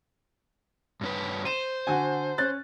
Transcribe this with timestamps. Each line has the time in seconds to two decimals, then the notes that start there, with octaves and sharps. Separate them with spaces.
1.01 G2 C#4 B4
1.45 C5 D#7 E7
1.87 D3 F#4 G#5
2.38 C#4 F#6 A6